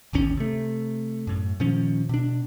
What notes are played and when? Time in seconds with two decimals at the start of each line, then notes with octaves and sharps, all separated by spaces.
0.13 D1 G#1 D#2 C#4
0.37 C3 A3
1.27 F#2 A2
1.60 A#2 D#3 F3 C#4
2.09 B2 D4